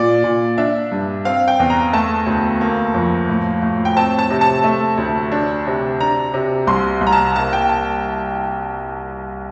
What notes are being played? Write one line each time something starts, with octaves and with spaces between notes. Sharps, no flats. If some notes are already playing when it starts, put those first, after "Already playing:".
Already playing: A#2 D5
A#2
D4 E5
G2
C4 F5
G5
E2
A#5
A3 A5
D2
A#3
F2
A2
A2
G5
C4 A5
A5
C3
A5
A3
D2
D4
C3
D4 A#5
C3
C2 C6
C2
A#5
A5
A#3 A5
G5
A5